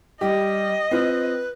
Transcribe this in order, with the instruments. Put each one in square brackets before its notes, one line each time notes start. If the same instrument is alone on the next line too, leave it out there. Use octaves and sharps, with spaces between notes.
[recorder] G3 [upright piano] G4 [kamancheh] D#5
[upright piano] C4 F4 [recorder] B4